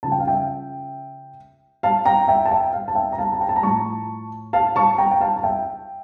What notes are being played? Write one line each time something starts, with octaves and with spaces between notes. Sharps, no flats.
C#3 F3 A5
G5
F5
E5 G5
F5 A5
G5 A#5
E5 G5
A5
E5 G5
F5
A5
E5 G5
A#5
F5 A5
A5
G5 A#5
A5
A#5
A2 F3 A5 C#6
F5 A5
A5 C#6
G5 A#5
G5
F5 A5
A5
E5 G5